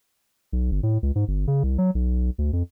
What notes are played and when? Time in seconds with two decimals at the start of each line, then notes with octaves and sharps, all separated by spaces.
0.53 B1
0.71 G1
0.83 A2
1.03 C#2
1.15 G#2
1.28 G1
1.47 C#3
1.63 C2
1.78 F#3
1.95 B1
2.38 D2
2.53 F2